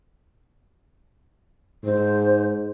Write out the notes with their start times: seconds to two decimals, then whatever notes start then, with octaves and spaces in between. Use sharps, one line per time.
1.84 G#2 C5